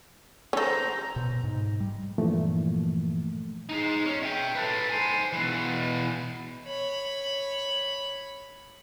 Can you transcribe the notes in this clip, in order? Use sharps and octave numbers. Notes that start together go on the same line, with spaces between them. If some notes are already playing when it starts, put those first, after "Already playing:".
C#4 A4 C5 A#5
B2
G#2
G3
G2 A#2 E3 F3 A3 A#3
D#4 G#4
C#4
E5 G5
A4 B4
C5 G#5
B2 E3
C#5 B5